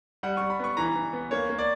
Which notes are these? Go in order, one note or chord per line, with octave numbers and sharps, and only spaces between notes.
G3 F#5
G3 C#6
B5
B3 C#6
E3 A#5
E3
B3
A#3 C#5
A#3
D5